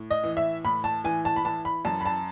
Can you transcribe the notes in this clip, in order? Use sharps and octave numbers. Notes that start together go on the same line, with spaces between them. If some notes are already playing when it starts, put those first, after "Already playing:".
Already playing: A2
D#5
E3
E5
A2 B5
A5
E3 G#5
A5
B5
E3 A5
B5
F#2 A5
B5
A5